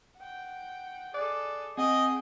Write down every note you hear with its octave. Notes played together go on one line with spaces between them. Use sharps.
F#5 G5
G#4 A4 D5 F#6
C4 G#4 D#5 F#5 G5 D#6